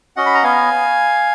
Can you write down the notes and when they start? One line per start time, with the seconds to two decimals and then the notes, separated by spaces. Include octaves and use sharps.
0.17 C#4 F#4 D#5 F#5
0.26 B5
0.35 A#5
0.43 B3 F5 G#5